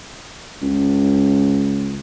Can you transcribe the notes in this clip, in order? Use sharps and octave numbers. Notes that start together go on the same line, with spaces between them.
C#2